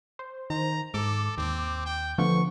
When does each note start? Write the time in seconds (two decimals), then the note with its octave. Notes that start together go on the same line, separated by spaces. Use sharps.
0.19 C5
0.50 D#3 A#5
0.94 G#2 A4 D6
1.38 D#2 C4
1.86 G5
2.18 D3 F3 A3 B3 C#6